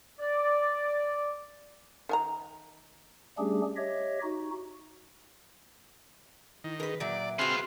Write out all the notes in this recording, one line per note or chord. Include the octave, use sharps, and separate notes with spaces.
D5
D#3 G#5 A#5
G3 A3 C#4 D4 G4 G#4
G4 C#5 D#5 E5
D#4 F#4
D#3 E4
G#4 A#4 B4
A#2 F#3 D5 E5
C4 F4 F#4 G#4 B4 C6 F6